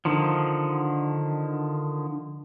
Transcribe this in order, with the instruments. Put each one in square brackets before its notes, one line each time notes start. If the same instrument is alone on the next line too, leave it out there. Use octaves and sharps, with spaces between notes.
[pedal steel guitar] D3 D#3 F3